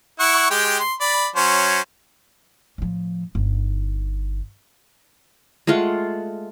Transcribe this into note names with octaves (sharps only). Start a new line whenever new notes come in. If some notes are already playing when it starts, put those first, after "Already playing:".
E4 F#5 C#6
G#3 G4 G5
C6
D5 B5
F#3 C#4 C5
A2 F3
G1 D#4
G#3 A3 F4 F#5